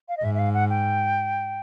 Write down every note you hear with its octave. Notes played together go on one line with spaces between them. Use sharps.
F5
D#5
G#2 E5
E5
F5
F#5
G5